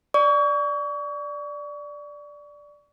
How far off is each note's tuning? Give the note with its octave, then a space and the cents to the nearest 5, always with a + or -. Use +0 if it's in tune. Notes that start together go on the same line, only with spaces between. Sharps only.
D5 +0 C#6 +35